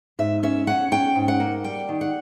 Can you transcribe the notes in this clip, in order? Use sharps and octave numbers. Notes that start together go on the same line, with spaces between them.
G#2 E5
C#4 E5
C#4 F#5
C#4 G5
G#2
F#5
A#3
G3 G5
D#3
F#5